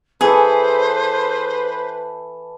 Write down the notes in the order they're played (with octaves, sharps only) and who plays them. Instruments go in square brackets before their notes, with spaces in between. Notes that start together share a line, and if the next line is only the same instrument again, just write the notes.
[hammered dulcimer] E3 A4 [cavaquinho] G#4 [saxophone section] B4 [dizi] C5